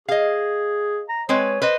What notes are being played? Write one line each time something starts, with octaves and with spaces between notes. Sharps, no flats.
G#4 D#5 F5
A#5
G#3 C4 B4 C#5
B4 C5 D#5